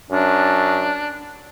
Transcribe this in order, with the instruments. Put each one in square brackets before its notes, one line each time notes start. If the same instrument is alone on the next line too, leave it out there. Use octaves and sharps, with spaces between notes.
[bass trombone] F#2 [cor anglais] D4